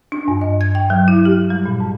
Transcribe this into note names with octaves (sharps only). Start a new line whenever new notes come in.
D4
G2
D#5
G#6
G5
F#3
E4
G4
G3
A#2
G#2